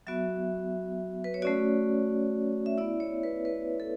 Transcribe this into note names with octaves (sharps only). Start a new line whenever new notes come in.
F#3 B3 F#4 E5
B4
C#5
A3 C#4 F#4 D5
E5
B3 E4 D5
C#5
B4
B4
A4